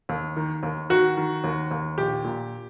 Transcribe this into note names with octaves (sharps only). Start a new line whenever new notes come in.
D#2
D#3
D#2
D#3 F#4
D#3
D#2
D#2
A#1 G4
A#2